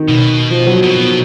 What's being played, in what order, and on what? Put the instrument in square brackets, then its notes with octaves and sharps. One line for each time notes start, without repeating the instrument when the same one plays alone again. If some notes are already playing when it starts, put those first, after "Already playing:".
Already playing: [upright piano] D#3
[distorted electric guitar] B2
[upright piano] F3
F#3
[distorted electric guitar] B2